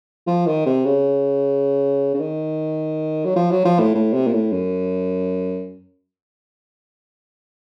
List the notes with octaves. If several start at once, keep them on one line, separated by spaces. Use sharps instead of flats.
F3
D#3
C3
C#3
C#3
D#3
F#3
F3
F#3
F3
A2
A2
C3
A#2
A2
F#2